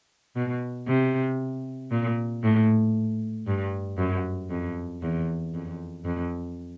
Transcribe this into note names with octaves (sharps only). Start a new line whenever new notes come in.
B2
C3
A#2
A2
G2
F#2
F2
E2
F2
F2